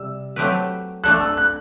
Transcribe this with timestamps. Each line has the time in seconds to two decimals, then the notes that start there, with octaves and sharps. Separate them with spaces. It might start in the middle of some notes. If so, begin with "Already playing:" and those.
Already playing: C3 G3 E6
0.36 F#3 A3 C4 G4 B4
1.04 A3 D4 A4 F#6
1.20 E6
1.37 F#6